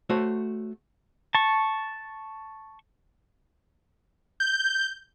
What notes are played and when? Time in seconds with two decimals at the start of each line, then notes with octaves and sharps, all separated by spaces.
0.10 A3 F#4 C5 C#5
1.35 A5 C#6
4.40 G6